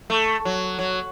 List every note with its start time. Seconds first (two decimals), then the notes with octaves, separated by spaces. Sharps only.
0.10 A3
0.45 F#3
0.79 F#3